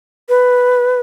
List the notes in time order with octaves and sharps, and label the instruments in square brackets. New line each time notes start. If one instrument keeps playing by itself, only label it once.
[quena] B4